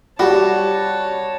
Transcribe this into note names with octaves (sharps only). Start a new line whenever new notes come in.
G3 F#4 C#5 A5